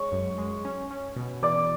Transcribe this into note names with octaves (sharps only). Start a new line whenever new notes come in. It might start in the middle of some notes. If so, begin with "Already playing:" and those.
Already playing: G#3 C#5 C#6
F#2
G#3
C#4
C#4
B2
E3 D5 D6